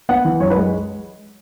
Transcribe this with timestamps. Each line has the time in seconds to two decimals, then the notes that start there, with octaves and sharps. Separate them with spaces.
0.09 B3 F#5
0.25 E3
0.40 F#2 C#5
0.50 B4
0.56 G#3